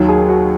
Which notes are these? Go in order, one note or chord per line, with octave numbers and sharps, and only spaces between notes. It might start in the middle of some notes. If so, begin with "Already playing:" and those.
Already playing: D#2 D#3 F#3
G#4
F#4